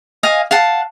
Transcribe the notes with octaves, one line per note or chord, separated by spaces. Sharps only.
D#5 F5 G#5
F5 F#5 A5